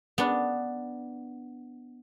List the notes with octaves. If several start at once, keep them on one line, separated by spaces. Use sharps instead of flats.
B3 D4